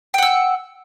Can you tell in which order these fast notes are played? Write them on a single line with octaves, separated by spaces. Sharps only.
G5 F#5 E6